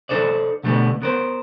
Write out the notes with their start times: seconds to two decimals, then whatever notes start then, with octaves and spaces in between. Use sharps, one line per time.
0.09 D#4 A4 C5 D5
0.64 B2 D3 G3 A3 B3
1.02 B3 A#4 C5